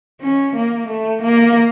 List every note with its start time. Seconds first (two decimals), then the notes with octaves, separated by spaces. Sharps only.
0.22 C#4
0.55 A#3
0.88 A3
1.22 A#3